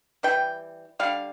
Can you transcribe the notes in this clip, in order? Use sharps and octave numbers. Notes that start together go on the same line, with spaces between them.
E3 G3 G5
D3 G3 F5